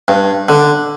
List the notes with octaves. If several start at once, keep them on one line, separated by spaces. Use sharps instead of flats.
G2
D3